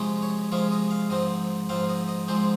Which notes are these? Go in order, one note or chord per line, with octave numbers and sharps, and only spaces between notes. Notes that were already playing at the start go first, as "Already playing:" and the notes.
Already playing: C3 F3 G#3 C#4
C#5
C3 F3 G#3 C#4 F5
D#5
F5
G#2 F3 C4 D#5
G#2 F3 C4 F5
D#5
D#5
G#2 F3 G#3 C4 C5